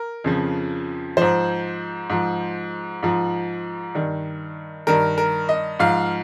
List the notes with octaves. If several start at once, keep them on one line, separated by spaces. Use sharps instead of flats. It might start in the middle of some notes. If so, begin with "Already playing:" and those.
Already playing: A#4
F2 C#3 F3
G#2 F3 C5
G#2 F3
G#2 F3
G2 D#3
G2 D#3 A#4
A#4
D#5
G#2 F3 F5